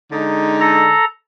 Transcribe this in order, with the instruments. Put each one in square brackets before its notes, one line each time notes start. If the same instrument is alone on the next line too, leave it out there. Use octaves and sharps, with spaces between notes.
[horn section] D3 G#3 D#4
[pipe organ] A4 A#5